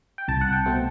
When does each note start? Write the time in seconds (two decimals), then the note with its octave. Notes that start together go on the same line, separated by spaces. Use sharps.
0.18 G5
0.28 C2 A5
0.41 F#5
0.53 G5
0.66 B2 A3 C4